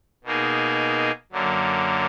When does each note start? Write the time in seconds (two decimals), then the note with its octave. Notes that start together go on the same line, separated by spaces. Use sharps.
0.24 B2 A#3 D#4 G#4
1.32 F#2 D3 F#3 A#3